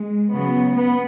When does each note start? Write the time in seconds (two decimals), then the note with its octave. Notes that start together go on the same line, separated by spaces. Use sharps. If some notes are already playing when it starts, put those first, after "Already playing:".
Already playing: G#3
0.31 C#3 F#3 B3
0.74 B3